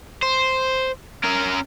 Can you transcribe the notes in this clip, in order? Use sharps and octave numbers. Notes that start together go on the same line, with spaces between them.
C5
C#4 A#4